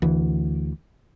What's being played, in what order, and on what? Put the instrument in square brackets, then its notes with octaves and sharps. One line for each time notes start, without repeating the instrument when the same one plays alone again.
[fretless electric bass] D2 E3